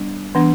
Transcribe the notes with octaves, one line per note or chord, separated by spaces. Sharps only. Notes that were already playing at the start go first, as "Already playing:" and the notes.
Already playing: G3 B3 D4
E3 B3 D4